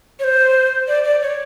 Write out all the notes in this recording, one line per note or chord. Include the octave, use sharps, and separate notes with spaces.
C#5
C5
D5
D5
C#5